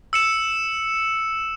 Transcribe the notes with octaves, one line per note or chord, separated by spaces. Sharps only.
E6 C#7 E7